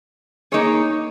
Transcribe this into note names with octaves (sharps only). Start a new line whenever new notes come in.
A#3 D#4 G#4 C#5